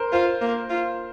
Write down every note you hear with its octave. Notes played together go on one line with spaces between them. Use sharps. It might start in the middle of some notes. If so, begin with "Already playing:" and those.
Already playing: A#4 C5
F4 C5
A#3
F4